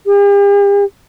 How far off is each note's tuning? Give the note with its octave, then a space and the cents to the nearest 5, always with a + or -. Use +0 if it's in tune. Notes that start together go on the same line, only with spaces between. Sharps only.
G4 +45